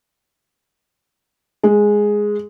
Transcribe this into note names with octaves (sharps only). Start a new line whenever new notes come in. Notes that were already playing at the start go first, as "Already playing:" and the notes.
G#3